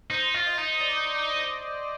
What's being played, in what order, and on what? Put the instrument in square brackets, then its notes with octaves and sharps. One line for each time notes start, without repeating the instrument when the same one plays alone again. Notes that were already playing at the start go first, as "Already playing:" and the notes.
[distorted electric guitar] D#4 [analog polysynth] C5
[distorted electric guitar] F4
[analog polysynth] D#5
[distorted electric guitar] D#4
[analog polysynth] D5